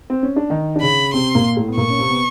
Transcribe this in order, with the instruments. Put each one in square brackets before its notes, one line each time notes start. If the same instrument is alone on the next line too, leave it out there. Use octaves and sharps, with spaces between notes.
[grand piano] C4
C#4
D4
D#3 D#4
D4
[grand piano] C#3 C#4 [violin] B5
[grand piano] C3 C4 [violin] C6
[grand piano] A#2 A#3
A2 A3
B3
[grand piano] A#2 A#3 [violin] C#6
[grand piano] C#4
C3 C4
B3